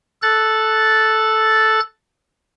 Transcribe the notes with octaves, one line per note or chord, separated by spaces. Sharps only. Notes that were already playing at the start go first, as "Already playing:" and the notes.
A4 F#6 A6